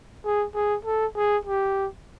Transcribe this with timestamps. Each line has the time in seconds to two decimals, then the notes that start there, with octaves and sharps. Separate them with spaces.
0.25 G#4
0.55 G#4
0.85 A4
1.16 G#4
1.45 G4